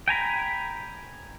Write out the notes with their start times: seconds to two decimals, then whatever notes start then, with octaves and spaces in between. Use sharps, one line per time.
0.08 G5 G#5 A#5 B5